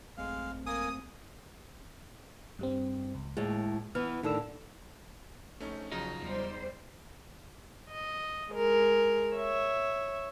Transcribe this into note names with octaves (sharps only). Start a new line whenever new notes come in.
A1 F#2 G#3 A3 C4 F5
A#3 G#5 D#6
G2 G3 C4
C#2
D#2 A2 G#3
E3 B3 F6
A2 D3 D#3 A4 E6
A#1 A3 C#4 D#4
A1 C#3 F3 F#3 D#4
E2 G3 C5
D#5
G#3 A#4
C#5 E5